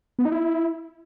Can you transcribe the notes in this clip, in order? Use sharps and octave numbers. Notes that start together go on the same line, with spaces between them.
B3
D#4
E4